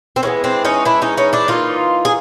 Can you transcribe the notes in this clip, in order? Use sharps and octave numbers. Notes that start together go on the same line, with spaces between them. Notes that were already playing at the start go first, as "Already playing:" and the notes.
C4
E3 G#3 B3 C#4
C4 D4
C#4 D#4
D4 E4
C#4 D#4
C#4 D#4
D4 E4
E3 G3 A#3 D#4 F4
G#4